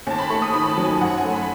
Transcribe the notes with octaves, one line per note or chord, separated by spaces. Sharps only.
D#2 A5
B5
A3 C#6
D#6
D#3 B5
B5
A5
F#3
G#5
F#2 F#5
G#5
A3
B5